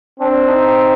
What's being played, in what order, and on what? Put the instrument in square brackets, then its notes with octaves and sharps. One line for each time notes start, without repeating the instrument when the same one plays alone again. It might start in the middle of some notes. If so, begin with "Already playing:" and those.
[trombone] C4 [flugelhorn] D4
[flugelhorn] D#4